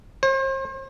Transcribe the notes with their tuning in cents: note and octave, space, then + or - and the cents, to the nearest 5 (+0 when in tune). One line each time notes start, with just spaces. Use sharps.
C5 +40